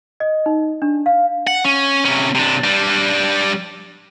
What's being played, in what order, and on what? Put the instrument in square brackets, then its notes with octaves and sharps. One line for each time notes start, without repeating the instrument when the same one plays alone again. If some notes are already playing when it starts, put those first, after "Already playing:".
[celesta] D#5
D#4
D4
F5
[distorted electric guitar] F#5
C#4
C3 C#4
C3 D4
G3 D4